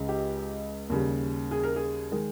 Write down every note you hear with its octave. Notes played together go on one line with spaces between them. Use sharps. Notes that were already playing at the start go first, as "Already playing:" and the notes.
Already playing: C#2 C#3 G#3
G4
D#2 C#3 G3
G#4
A#4
G#4
D#3 G#3